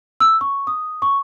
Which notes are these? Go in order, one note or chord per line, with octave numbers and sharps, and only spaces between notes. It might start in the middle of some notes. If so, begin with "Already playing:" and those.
E6
C#6
D#6
C#6